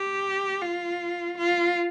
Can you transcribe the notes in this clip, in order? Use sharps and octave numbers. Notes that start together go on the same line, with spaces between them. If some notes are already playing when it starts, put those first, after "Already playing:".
Already playing: G4
F4
F4